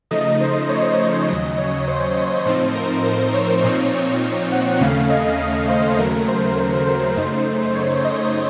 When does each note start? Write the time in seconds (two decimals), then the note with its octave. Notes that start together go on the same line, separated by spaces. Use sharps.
0.11 C#3 F3 A3 D#4 D#5
0.40 C5
0.69 C#5
0.98 D#5
1.28 D#2 C#3 F#3 D#5
1.58 C#5
1.88 C5
2.16 C#5
2.45 A2 F3 C4 D#4 C5
2.75 A#4
3.05 C5
3.34 C#5
3.64 A#2 F3 C4 D#4
3.93 C#5
4.52 F#5
4.81 D#2 C#3 A3 C#4 F5
5.10 D#5
5.69 C5
5.98 D#2 C#3 F#3 A3 A#4
6.28 C5
6.87 C5
7.16 F#2 C#3 A3 D#4
7.75 C#5
8.05 D#5